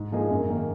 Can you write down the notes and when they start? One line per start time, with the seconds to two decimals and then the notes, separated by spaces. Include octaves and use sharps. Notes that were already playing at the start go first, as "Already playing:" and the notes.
Already playing: G#2
0.12 F3 A#3 D#4 G#4
0.30 F#2
0.49 D#3 A#3